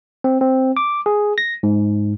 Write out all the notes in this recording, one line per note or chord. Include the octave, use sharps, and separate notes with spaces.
C4
C4
D6
G#4
A#6
G#2